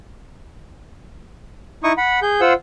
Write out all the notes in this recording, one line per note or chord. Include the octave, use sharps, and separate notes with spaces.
D#4 E4 C#6 D#6
F#5 B5
G#4 G6
F4 C5 F#5 E6